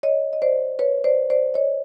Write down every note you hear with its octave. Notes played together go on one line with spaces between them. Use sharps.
C#5 D#5
D#5
C5 D5
B4 C#5
C5 D5
C5 D5
C#5 D#5